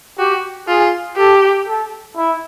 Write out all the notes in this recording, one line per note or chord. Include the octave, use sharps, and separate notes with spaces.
F#4 G4
F4 G#4
G4 A4
A4
E4